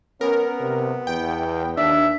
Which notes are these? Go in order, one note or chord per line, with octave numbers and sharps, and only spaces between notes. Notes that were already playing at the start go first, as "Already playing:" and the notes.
B3 C#4 A#4
C3
E2 G5
D#2 D4 E5